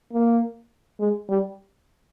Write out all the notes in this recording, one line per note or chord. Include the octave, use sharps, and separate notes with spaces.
A#3
G#3
G3